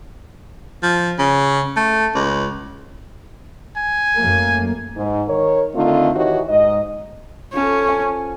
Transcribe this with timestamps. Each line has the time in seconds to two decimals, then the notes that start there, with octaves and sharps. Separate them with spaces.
0.83 F3
1.19 C#3
1.77 A3
2.15 C#2
3.77 G#5
4.17 F#2 A3 A#3
4.96 G#2
5.27 D#3 A#4 C#5
5.74 D3 D#3 A3 C4 D#4 F4
6.15 D#3 E3 F#4 G4 C#5 D#5
6.49 G#2 D#5
7.54 F3 C#4 A4 A5
7.89 G#5 D6